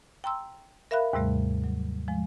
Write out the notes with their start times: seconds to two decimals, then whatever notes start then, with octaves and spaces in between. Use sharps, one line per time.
0.24 G5 A#5 C6 E6
0.91 A#4 E5 F5 B5 F#6
1.13 D#2 G#2 C3 G3 A3
1.64 F#3
2.08 F3 G#3